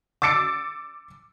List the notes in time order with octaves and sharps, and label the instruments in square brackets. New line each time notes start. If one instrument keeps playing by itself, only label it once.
[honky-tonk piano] D6 E6 A6 C#7 D7